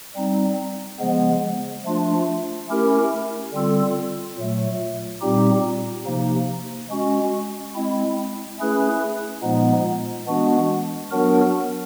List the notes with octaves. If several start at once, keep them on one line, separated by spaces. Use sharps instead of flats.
G3 C4 D#4
C#3 F3 G#3 B3
F3 A3 D4 F4
A3 C#4 E4 G4 A#4
D3 G3 C4 F4 A4
A#2 F#3 A3
A#2 G3 C4 D#4 G4
C3 F3 A#3 D#4
G#3 C#4 F#4
G#3 C4 E4
A3 C#4 E4 G#4 B4
A#2 F3 G#3 B3 D#4
E3 G#3 B3 D4 F#4
F#3 B3 D4 F#4 A#4